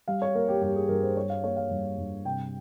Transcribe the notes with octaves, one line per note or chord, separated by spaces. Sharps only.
G3 F5
C#5
A#3 A#4
G4
G2 G4
G#4
G2 A#4
C5
G3 C#5
F5
A#3 C#5
F5
G2
G2
C3 G5